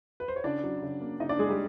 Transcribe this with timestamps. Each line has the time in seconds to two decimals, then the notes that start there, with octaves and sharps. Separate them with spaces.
0.20 B4
0.28 C5
0.36 C#5
0.44 C#3 D4 D5
0.63 F#3
0.82 C#3
1.01 A#3
1.20 C#3 D#4 D#5
1.29 D4 D5
1.39 C#3 G#3 G#4
1.49 G3 G4